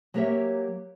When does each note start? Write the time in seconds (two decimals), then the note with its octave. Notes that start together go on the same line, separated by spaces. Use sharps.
0.14 F#3 A#3 G4 A#4 C#5 E5